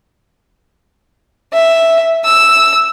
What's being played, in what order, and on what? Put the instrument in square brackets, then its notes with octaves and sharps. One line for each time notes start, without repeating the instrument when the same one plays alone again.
[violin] E5
E6